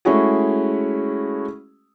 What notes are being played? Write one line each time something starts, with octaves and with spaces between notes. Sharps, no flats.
G#3 A3 C#4 E4 F#4 G#4